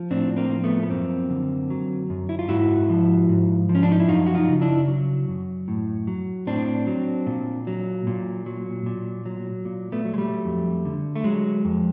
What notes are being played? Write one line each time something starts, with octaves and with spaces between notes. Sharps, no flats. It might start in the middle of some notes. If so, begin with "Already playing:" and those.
Already playing: F3
A2 C4 D4
A#3 C4
F3
A3 B3
B3
F#2 A#3 C4
D3
F#3
F#2
E4
F4
G#2 E4 F#4
F3
G#2
F3
C#4
D4
D#4
E4
F#2 D#4 F4
F#4
D#4 F4
C#3
D4 E4
F#3
F#2
A2
F#3
A2 C4 D4
F#3
A#2
F#3
A#2
F#3
A#2
F#3
A#2
A3 B3
F#3
G#3
G3 A3
F2
D3
A3
F#3 G#3
F2